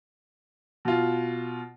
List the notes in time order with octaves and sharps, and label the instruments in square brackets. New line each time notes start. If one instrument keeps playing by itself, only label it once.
[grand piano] B2 F4